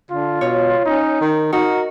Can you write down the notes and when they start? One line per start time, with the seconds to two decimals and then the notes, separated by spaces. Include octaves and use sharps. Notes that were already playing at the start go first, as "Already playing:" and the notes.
0.11 D3 F4
0.41 B2 C#5
0.86 C#4 D#4
1.21 D#3
1.53 D#4 F#4 A#4